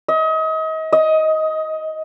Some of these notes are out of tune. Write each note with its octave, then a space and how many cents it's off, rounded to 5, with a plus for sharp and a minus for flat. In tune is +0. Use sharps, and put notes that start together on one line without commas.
D#5 +35
D#5 +15